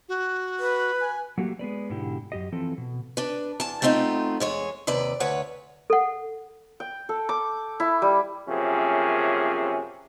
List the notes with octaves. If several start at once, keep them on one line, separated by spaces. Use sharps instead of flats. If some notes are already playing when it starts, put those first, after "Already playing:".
F#4
B4
G#5
F#3 A3 A#3 F#4 G4
G#3 B3 B4 D5
G#2 B2 D3 E4 G4
F#2 G4 D#5
E3 F3 C4 A4
B2
D4 B4
E2 A5
A3 B3 C4 D#4 F4
E2 G#3 C#5
D#2 C3 B4 D5
D2 B4 C#5 F#5
A4 F#5
G5
A4
D6
E4
G3
F#2 C3 F3 A#3 C#4 G#4